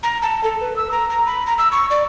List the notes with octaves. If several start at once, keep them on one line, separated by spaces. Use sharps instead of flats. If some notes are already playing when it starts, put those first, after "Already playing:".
A#5
A5
A4
B4
E6
A#5
A#5
B5
A#5
E6
C#6
D5